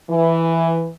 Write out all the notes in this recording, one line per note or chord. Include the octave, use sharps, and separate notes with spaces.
E3